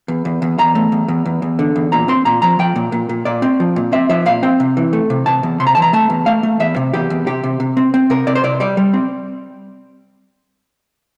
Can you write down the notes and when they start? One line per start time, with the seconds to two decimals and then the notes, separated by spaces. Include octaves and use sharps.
0.08 E2
0.25 E2
0.42 E2
0.59 E2 A#5
0.75 A3
0.92 E2
1.08 E2
1.25 E2
1.42 E2
1.59 D3
1.76 E2
1.92 A#2 A#5
2.08 C4 C6
2.25 A#2 A#5
2.42 F3 A#5
2.59 F3 G5
2.76 A#2
2.92 A#2
3.09 A#2
3.25 A#2 D5
3.42 C4
3.60 F3
3.76 A#2
3.92 C4 E5
4.09 F3 E5
4.26 A#2 F5
4.43 C4 G5
4.60 C3
4.77 E3
4.93 A3
5.10 C3
5.26 C3 A5
5.43 E2
5.60 C3 C6
5.67 A#5
5.75 E3 A5
5.82 A#5
5.93 A3 A5
6.10 E2
6.26 A3 F5
6.43 A3
6.60 E2 E5
6.76 C3
6.93 E2 G4
7.10 E2
7.27 C3 G4
7.43 C3
7.60 C3
7.77 C4
7.94 C4
8.10 C3 A#4
8.27 C3 D5
8.35 C5
8.44 C3 D5
8.60 G3 D5
8.77 G3
8.94 C4